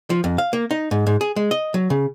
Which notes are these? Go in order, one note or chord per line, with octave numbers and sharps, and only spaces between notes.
F3
F2
F5
A#3
D#4
G#2
G#2
G#4
G#3
D#5
F#3
C#3